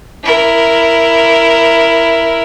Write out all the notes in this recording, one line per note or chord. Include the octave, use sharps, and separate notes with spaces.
E4 A#4